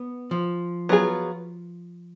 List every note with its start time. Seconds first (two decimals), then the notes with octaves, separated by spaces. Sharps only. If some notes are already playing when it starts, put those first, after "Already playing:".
Already playing: B3
0.31 F3
0.89 F#3 B3 F4 G#4